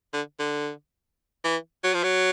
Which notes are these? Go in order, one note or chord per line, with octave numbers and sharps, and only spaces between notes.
D3
D3
E3
F#3
F3
F#3